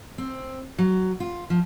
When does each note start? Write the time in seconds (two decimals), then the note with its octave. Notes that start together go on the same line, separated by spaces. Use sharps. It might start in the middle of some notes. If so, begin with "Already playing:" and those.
0.18 C4
0.78 F#3
1.20 F4
1.50 F3